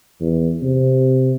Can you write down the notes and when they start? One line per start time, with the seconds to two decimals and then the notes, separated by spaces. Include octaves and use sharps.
0.20 E2
0.62 C3